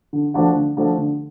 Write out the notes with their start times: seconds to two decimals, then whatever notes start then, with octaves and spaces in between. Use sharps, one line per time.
0.13 D3
0.34 F3 A3 D4 F#4
0.56 D3
0.77 F3 A3 D4 F#4
0.98 D3